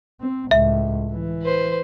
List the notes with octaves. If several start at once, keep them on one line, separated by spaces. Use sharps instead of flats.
C4
C#2 A2 E5
E3
B4 C5